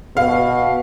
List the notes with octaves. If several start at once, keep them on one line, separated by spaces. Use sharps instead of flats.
B2 F5